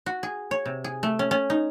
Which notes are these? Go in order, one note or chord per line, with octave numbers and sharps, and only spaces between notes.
F#4
G#4
C#5
C3
G#4
A3
C#4
C#4
D#4